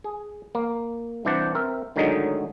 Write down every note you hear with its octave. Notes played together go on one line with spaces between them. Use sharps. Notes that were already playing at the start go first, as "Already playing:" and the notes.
G#4
A#3
C2 E3 D4 C5 D5 F#5
C4 A#4 E5
A2 D3 D#3 F#3 G#3 D#4